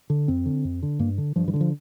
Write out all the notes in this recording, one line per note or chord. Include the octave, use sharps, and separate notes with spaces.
D3
F2 C4
D3
F2
D3
G2 A#3
D3
G2 F3
E3
D3
F3